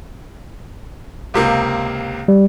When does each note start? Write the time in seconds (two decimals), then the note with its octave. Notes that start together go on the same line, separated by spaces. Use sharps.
1.34 C#2 C3 A#3
2.28 G3